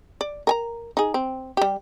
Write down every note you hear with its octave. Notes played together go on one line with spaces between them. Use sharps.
D5
A#4 G#5 A#5
D#4 G#4
C4
G3 G4